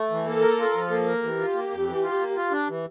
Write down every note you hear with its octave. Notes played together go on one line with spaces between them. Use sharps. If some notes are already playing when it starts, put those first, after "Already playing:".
Already playing: A3
E3
A#3 A4
A#4
F4
F3
A#3
A#4
E3 G4
F4
A#3
F2
E3
F4
A#3
F4
D4
E3